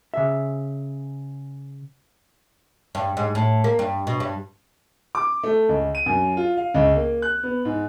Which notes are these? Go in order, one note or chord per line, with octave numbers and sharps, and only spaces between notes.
C#3 E5
G2
G#2
A2
A#3
G2
B2
G2
D6
A3
C#2
D#7
F#2
F4
F5
C#2
A#3
F#6
B3
G#2